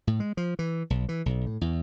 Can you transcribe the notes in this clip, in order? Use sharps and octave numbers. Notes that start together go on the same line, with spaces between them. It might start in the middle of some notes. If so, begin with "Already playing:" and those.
A2
G#3
F3
E3
B1
E3
B1
A2
E2